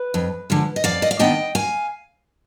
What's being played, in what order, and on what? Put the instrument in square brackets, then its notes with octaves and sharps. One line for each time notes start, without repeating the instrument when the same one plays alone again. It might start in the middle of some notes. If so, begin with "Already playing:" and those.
Already playing: [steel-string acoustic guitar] B4
F2
D3 F3 G#3
D#5
F2 D5 F5
D#5
F5
D#3 B3 D4 D#5 G5
F5 G#5